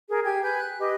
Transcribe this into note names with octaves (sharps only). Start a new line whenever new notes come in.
G#4 A#4
G4 G5 G#5 G#6
B4 G#5 G6
F#6
G4 B4 D#5